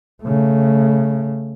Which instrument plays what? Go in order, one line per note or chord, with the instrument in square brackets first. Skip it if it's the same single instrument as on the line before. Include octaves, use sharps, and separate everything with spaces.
[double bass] C#3 A3